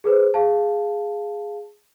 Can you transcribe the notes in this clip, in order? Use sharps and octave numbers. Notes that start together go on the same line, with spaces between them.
G#4 A4 B4 C5
G#4 F5 A5